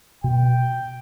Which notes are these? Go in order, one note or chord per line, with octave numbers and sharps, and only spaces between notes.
B2 G5